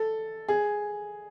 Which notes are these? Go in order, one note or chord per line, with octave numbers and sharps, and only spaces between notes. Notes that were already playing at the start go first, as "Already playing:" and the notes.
Already playing: A4
G#4